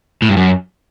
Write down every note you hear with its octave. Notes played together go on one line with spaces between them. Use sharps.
A2
G2
F#2